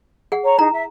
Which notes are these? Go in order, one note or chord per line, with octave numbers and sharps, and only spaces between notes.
G#4 F#5
C#5 A#5
D#4 E4 G#4 A#5
E5